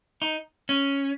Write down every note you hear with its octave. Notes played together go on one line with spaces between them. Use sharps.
D#4
C#4